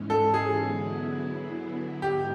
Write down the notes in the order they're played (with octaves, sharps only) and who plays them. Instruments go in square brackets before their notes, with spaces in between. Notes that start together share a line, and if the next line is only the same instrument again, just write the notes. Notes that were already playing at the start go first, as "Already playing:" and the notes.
Already playing: [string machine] G#2 E3 G#3 C#4
[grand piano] A4
G#4
[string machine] D3 F#3 B3 E4
[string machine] G#2 F3 G#3 [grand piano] G4